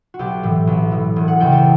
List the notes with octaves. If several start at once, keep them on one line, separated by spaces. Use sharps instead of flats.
F#4
B1 G4
A2 E3
B1
A2 E3
E1
F#5
E2 C#3 E3 G5
A5